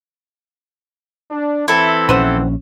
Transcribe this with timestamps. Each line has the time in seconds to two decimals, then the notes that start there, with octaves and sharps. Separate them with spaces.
1.31 D4
1.68 E3 C4 E4 A4
2.09 A#1 C#4 B4 C5 F#5